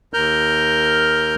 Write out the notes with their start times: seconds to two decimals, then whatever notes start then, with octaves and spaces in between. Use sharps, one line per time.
0.14 D#2 A#4 F6 G6